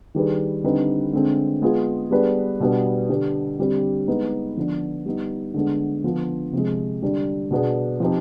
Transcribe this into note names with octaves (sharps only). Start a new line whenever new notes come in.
D#3 G3 D4 G#4 B4
D3 G3 C4 D#4 B4
D3 G#3 C4
G#3 B3 F4 G#4
G3 B3 D4 G#4 B4
B2 G3 B3 D4
D3 G3 D4 G4
D3 G3 C4 G4
G#3 B3 D#4 B4
D3 F3 B3 D4
G3 B3 D#4
D3 G#3 B3 D4
D3 F3 B3 F4
C3 F3 G#3
D3 G3 D4
B2 B3 D4 G#4
F3 C4 D#4 G4